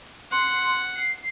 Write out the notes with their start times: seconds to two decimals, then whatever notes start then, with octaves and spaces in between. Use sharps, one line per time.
0.32 F#5 C6
0.95 C7